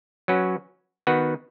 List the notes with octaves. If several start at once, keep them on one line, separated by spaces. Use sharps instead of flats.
F#3 C#4 F#4 B4
D#3 B3 F#4 B4